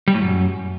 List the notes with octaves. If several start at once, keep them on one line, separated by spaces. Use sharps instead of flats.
G3
A2
F#2